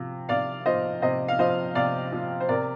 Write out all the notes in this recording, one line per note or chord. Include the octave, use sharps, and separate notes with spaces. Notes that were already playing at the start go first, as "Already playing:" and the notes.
Already playing: C3 F3
C3 D5 F5
F3 C5 D#5
C3 C5 D#5
F5
F3 C5 D#5
C3 D5 F5
F3
C5
C3 A#4 D5